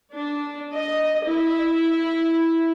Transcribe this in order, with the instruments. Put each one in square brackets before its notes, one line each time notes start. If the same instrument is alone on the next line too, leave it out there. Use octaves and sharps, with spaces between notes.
[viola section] D4
D#5
E4